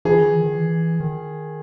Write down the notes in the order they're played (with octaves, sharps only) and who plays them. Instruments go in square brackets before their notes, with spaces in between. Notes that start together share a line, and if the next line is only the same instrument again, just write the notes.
[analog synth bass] E3 [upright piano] G#4
[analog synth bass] D#3
E3
D#3
E3
D#3